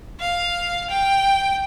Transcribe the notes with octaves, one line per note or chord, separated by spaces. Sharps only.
F5
G5